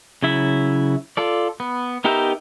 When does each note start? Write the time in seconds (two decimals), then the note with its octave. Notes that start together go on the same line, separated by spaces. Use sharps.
0.23 C#3 F#3 E4 E5
1.17 F4 A4 D5
1.60 B3
2.04 B3 D#4 G4 A#4 E5